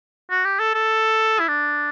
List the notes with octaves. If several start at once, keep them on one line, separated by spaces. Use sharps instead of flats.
F#4
G4
A4
A4
E4
D4